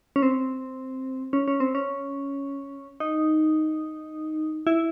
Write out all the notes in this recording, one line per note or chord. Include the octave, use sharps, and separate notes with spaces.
C#4
C4
C#4
C#4
C4
C#4
D#4
E4